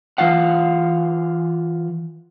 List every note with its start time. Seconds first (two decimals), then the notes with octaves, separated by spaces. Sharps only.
0.18 E3 F4 F5 F#5